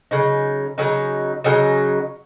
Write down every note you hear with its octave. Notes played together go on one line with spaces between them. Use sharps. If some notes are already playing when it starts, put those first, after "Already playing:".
C#3 F#3 D#4
C#3 F#3 D#4
C#3 F#3 D#4